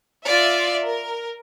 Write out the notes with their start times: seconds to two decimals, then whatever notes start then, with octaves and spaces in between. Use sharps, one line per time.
0.24 F4 D5 E5
0.86 A#4